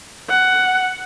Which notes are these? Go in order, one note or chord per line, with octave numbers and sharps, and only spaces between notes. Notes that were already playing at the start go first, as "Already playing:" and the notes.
F#5